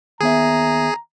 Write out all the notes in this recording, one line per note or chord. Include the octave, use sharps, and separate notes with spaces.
D#2 B3 G#4 E5 A#5